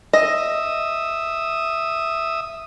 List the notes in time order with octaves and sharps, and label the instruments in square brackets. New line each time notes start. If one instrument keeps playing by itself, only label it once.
[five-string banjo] D#5 [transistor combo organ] E5 D#6